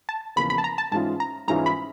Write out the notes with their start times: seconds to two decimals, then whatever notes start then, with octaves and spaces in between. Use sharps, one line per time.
0.09 A5
0.36 E2 C#3 F3 A#3 B5
0.50 B5
0.58 A5
0.64 A#5
0.78 A5
0.92 G#2 E3 G#3 C#4 F4 A5
1.20 A#5
1.48 G#2 E3 G#3 C#4 F4 A#5
1.66 B5